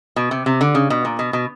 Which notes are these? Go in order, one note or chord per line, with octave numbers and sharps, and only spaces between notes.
B2
C3
C3
D3
C#3
B2
A#2
B2
B2